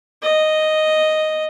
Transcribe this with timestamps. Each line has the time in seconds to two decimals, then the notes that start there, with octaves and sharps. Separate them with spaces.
0.23 D#5